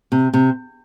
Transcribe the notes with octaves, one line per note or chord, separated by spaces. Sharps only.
C3
C3